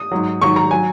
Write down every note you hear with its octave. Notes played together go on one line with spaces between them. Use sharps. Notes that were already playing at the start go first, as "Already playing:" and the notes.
Already playing: D#6
G#2 F#3
G#2 D#3 F#3 C#6
A#5
F#3 G#5